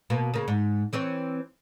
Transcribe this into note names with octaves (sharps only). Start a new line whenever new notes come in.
B2 A#3
C#3 A#3
G#2
E3 C4 C#5